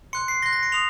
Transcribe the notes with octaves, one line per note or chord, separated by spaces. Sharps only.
C6 F#6 C#7
C7
C6 F#6 A#6
A#6
C#7
C6 D#6 F7